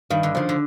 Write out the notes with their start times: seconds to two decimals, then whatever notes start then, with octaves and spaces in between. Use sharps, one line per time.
0.10 G2 D#3
0.23 D3
0.35 C#3 F3
0.49 D3